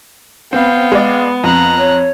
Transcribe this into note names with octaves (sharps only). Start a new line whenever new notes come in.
B3 C4 F5 G5
G#3 D5
F2 A#5 F#6
C#5